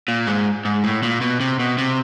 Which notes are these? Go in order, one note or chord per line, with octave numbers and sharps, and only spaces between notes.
A#2
G#2
G#2
A2
A#2
B2
C3
B2
C3